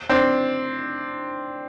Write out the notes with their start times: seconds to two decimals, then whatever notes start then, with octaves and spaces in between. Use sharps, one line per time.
0.10 C4 D4